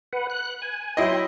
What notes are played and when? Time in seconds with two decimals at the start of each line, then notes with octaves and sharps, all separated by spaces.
0.13 B4 F#5
0.30 F#6
0.62 G#5
0.97 F#3 E4 D#5 G5 C6